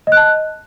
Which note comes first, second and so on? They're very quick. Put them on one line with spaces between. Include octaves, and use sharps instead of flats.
D#5 F#6 A5